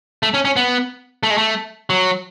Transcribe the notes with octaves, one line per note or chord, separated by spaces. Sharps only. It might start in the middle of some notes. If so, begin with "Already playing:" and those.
A3
C#4
C#4
B3
A3
G#3
A3
F#3